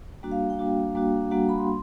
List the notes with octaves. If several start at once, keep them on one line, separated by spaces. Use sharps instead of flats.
G3 A#3 D4 F#4
F5
G5
G3 A#3 D4 F#4
G3 A#3 D4 F#4
G3 A#3 D4 F#4 F#5
B5
C6